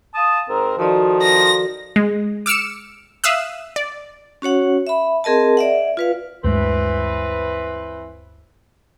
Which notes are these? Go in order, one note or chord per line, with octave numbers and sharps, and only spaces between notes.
F5 A5 D#6
G#2 C4 A#4
D#3 F3 F#4 A4 D5
A#6
G#3
D6 E6 F6 C#7 E7
E5 F5 D#6 E6 F#6
D5
C#4 F#4 C#5 F#5
E5 B5
C4 G#4 A#4 D#5 A5
D5 E5 F#5
F4 B4 F5
D2 G2 E3 G#3 C4 B4